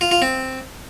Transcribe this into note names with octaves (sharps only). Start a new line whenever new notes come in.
F4
F4
C4